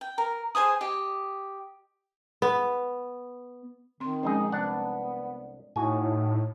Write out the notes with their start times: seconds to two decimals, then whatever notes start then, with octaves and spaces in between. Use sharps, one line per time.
0.01 G5
0.18 A#4
0.55 G#4 C5 G#5 D#6
0.81 G4 D#5
2.42 B3
4.00 D#3 C4 C6
4.23 A#1 F3 G#3 C#4 D#4 G#4
4.52 C2 B3 D4 F#5
5.76 A2 D#4 F#4 G#5